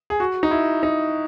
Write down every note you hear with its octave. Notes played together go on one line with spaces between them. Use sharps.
G#4
F#4
D#4
E4
D#4